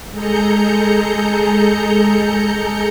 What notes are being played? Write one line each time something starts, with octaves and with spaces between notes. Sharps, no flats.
G#3 G#4 A4 A#5 G6 C#7